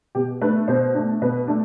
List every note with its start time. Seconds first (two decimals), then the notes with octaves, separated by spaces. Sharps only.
0.15 B2 G4
0.41 A3 D4 B4
0.68 B2 C5
0.94 A3 D4
1.22 B2 B4
1.47 A3 D4